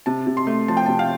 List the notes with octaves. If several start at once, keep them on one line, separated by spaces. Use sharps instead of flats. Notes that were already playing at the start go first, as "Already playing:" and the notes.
C3 A5
C3
C6
A3
F3 A5
G5
C3 A5
F5